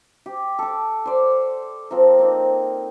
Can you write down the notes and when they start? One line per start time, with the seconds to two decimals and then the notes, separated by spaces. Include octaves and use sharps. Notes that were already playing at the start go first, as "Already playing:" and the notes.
0.26 G4
0.59 A4 D6
1.06 C5 D5
1.91 F3 C4 A#4
2.19 A#3 C4 D#4